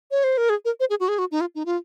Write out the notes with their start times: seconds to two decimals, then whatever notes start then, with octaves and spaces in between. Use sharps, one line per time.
0.11 C#5
0.24 C5
0.38 A#4
0.50 G#4
0.65 A#4
0.80 C5
0.90 G#4
1.00 F#4
1.08 G#4
1.19 F#4
1.31 D#4
1.41 F4
1.55 D#4
1.66 F4